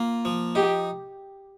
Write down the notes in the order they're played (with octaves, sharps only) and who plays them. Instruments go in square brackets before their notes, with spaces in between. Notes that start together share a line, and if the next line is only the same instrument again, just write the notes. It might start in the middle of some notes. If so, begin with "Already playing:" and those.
Already playing: [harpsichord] A#3 F4
F3
[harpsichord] D#4 [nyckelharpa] G4